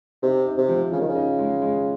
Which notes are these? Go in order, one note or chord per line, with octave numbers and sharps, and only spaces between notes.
C3 D#4
D#4
C3
F3
C#3 F3
D#3
C#3
D#4
G#3
G#3